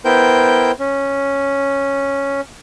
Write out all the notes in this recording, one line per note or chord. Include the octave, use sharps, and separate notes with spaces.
B3 E4 A#4 C5 G5 G6
C#4